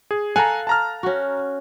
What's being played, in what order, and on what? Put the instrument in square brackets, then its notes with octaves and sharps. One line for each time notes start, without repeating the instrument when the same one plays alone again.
[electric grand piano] G#4
[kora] A4 F5 F#5 [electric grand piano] G#5 A#5
[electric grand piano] A5 A#5 F6
[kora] C#4 F#4